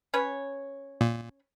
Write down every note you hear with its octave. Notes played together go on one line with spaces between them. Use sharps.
C#4 B4 C#5
A#2